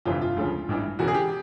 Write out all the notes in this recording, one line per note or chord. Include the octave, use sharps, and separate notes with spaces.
G1 F2 C3 E3 F4
F4
D2 C#3 F3
A1 G2 E3
E1 E2 C#3 F#4
G#4
G4